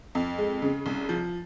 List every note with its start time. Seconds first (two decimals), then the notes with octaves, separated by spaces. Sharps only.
0.15 F2
0.38 G#3
0.62 C#3
0.86 C2
1.09 F3